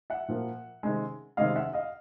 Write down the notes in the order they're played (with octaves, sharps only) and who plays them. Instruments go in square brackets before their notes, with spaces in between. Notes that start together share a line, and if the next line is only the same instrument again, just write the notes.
[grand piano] E5 F#5
A#2 F3 A#3
C3 D#3 G#3 C#4
C3 D#3 G#3 C#4 D#5 F5
E5 F#5
D#5 F5